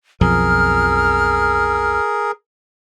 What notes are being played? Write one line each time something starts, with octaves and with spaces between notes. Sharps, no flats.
B1 F2 F3 G#4 A#4 F6